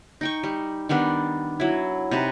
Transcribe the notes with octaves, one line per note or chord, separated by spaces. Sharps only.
D#4 G5 C#6
G3
D#3 G3 B3 D4
F#3 E4
C3 D#4 B4